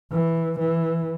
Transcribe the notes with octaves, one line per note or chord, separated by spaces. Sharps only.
E3
E3